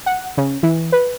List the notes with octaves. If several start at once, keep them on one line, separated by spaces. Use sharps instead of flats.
F#5
C#3
E3
B4